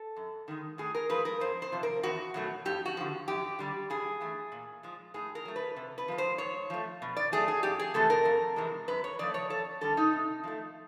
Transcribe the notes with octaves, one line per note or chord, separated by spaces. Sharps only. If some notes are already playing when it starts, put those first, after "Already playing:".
Already playing: A4
F#2
D#3 G#3
A2 G#4
A#4
F3 G#3 B4
A#4
F2 C5
C5
C3 F3
A#4
E2 F#4
B2 F#3 A3
F2 G4
F#4
D3 F3
F#2 G4
D3 G3
G2 G#4
E3 A3
A#2
F3 G#3
A2 G#4
A#4
F#3 A3
B4
C3
B4
F3 G#3
C5
G#2 C#5
F3 A3
B2
D5
F#3 A3 G#4
G#4
F2 G4
G#4
C3 E3 A3 A4
A#4
F2
C3 E3 G#3
F#2 B4
C#5
C#3 F3 A3 D5
C#5
F2 A4
D3 G3 A4
D#4
C3
F3 A3